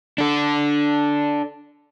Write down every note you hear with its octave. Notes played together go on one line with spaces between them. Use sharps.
D4 A4